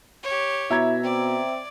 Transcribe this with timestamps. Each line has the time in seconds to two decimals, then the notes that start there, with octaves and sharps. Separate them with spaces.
0.23 G4 C#5
0.71 B2 E4 E5 A#5 G#6
1.03 C4 D5